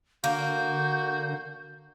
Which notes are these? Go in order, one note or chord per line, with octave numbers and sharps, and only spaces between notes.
D3 A#3 F#4 G6